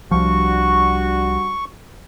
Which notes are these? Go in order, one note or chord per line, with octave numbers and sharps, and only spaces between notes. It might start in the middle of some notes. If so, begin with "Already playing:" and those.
C2 F3 G3 D4 F#4 C#6